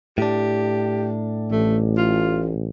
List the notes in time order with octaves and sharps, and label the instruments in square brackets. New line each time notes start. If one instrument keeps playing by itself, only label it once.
[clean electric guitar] A2 D4 [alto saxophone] G4
[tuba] A1 [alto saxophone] A3
[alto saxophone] F4